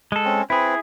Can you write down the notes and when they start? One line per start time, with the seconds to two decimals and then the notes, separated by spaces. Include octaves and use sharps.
0.12 G#3 A4
0.25 C4 C#4
0.50 C4 E4 G#4 B4